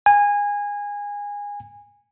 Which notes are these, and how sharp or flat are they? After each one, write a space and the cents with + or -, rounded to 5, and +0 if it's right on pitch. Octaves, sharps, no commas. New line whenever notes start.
G#5 -20